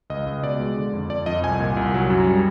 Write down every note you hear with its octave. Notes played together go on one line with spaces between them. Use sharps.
C#2 D#5
C#2
B2 D5
G#3
D3
F2
F2 D5
F2 D#5
C2 G#5
A#2
C2
F#3
F#2
G3